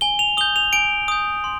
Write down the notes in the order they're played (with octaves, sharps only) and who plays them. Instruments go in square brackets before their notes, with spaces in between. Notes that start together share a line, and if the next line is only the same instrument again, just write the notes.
[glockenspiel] G#5 G7
F7
D#6 G6 G7
F7
G#5 D7
D#6 G6
C6